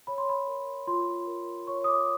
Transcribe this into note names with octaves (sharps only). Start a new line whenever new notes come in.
C#5 B5
C6
B5
A#4
F4 C6
A#4
C#5 C#6
D#6
D6